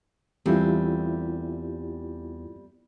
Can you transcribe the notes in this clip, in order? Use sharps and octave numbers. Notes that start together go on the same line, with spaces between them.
E2 G3 A3 C4 E4 F4 G4